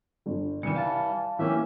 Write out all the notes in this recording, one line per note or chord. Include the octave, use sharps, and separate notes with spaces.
G1
C2 D#3 E3 G3 C#7
F5 A5
E3 A#3 C#4 G4 E5